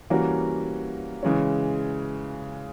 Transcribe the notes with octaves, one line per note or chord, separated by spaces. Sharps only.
E3 G3 A#3 C#4 F#4
C#3 E3 G#3 C#4